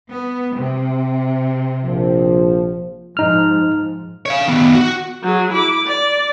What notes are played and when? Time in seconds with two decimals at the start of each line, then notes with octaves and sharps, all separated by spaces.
0.11 B3
0.56 C3
1.85 A#1 F3
3.17 G#2 F3 D#4 F6
4.26 C#5 F5
4.48 D#3 B3
4.75 F#4
5.24 F#3 G#4
5.52 E4 D6
5.87 D5